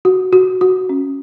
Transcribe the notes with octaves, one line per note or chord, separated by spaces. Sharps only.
F#4
F#4
F#4
C#4